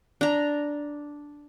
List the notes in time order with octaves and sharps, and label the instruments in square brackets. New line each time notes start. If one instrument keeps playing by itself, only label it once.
[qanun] D4 A#5